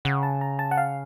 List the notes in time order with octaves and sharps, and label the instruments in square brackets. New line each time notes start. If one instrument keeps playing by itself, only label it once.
[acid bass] C#3 [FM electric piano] F#5
[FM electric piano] A5
A#5
A5
F#5
F5